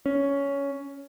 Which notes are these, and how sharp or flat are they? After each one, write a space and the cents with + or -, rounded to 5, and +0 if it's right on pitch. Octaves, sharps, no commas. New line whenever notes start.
C#4 +10